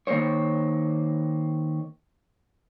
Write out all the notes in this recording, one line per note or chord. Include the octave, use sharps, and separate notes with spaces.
D#3 A#3 D#4 C5 C#5